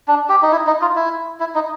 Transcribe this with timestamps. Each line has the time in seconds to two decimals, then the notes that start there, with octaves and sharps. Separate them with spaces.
0.08 D4
0.29 G4
0.43 D#4
0.52 E4
0.67 D#4
0.82 F4
0.96 E4
1.40 E4
1.55 D#4